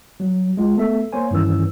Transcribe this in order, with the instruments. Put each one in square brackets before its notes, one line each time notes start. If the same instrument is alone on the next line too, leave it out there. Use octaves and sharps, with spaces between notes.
[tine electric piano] F#3
G#3 F4
A3 B3 A4 E5
A#3 C5 C#5 G#5
G2 D#3 E3 C#4 E6